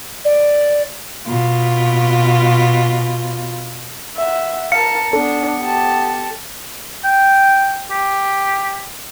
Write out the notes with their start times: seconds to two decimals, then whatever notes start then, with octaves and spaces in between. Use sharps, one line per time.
0.25 D5
1.28 B2 F4
4.17 E5 F#5
4.72 A#4 F5 A5 C#7
5.13 B3 D4 A4
5.61 G4 A5
7.04 G5
7.90 G4